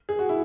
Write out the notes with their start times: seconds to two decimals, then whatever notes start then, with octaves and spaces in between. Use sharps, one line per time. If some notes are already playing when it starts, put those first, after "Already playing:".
0.09 G#4
0.19 F#4
0.29 E4